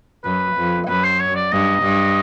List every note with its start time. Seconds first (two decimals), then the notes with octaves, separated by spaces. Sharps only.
0.24 F#2 B4
0.56 F2
0.88 F#2 B4
1.04 C5
1.20 C#5
1.35 D5
1.52 G2 D#5
1.82 G2